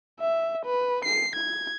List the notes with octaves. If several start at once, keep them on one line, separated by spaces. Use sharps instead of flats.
E5
B4
C7
G#6